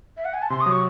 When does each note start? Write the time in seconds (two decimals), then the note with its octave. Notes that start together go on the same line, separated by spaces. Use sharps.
0.17 E5
0.25 F#5
0.34 G#5
0.42 A5
0.50 C3 C6
0.61 D#6
0.66 F#3
0.71 C#6